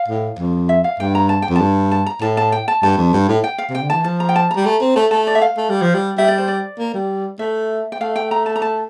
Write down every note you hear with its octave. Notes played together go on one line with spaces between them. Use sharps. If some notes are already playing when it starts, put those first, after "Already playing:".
Already playing: F5
A2
F2
E5
F5
G2 G5
A#5
A5
G5
F2
A5
G2
A5
A#5
A2 A5
A5
G5
A5
G2 A5
F2
G2
A2
G5
F5
C3
G5
D3
E3 A5
F3 A5
A#5
G5
A5
A#5
G3
A3
C4
A3 A5
A3 A5
D5
E5
F5
A3
G3
F3
G3
G3 E5
D5
C5
D5
A#3
G3
A3 E5
G5
A3 F5
G5
A#5
A5
A#5
A5